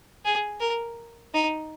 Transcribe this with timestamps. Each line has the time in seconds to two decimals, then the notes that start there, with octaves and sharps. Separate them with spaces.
0.25 G#4
0.60 A#4
1.34 D#4